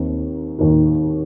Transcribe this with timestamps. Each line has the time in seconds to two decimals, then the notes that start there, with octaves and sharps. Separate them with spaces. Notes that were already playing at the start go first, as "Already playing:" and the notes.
Already playing: D#2 D#3 C4
0.59 D#2 D#3